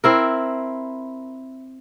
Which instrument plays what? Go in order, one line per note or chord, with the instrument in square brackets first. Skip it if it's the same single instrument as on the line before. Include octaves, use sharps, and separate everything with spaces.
[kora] C4 E4 A#4